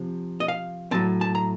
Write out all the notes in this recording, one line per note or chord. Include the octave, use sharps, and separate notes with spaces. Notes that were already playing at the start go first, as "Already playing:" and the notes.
Already playing: C3 F3
D#5
F5
A2 F#3 C4 A5
A5
A#5